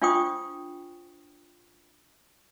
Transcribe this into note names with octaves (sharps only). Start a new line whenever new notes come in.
D4 F4 C5 G5 C#6 D#6